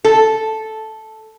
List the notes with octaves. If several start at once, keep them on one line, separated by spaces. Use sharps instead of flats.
A4